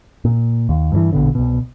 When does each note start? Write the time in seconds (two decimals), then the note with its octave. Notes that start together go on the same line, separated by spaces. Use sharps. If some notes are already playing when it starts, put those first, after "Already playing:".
0.25 A#2
0.69 D#2
0.92 G2 C#3 E3
1.13 A#1 B2 D3
1.35 C2 B2